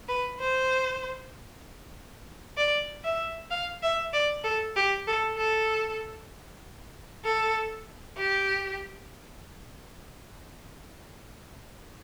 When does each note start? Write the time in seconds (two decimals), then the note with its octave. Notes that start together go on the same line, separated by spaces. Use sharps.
0.09 B4
0.40 C5
2.57 D5
3.05 E5
3.51 F5
3.83 E5
4.13 D5
4.44 A4
4.76 G4
5.07 A4
5.37 A4
7.25 A4
8.17 G4